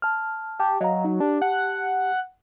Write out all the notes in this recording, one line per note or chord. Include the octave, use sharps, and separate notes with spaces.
A5 F6
G4 A5
F#3 D#5 F5 A#5
D#4
D4 G4 A5
F#5